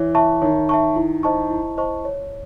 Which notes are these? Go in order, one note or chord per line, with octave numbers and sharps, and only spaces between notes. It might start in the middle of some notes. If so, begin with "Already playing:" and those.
Already playing: E3 C#5
E5 A5 C#6
D#3 C#5
E5 A5 C#6
E4
C5 D#5 A5 C#6
E4
C5 D#5 A5 C#6
C#5